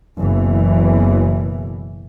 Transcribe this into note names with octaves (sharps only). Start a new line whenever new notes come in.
F#1 B2 E3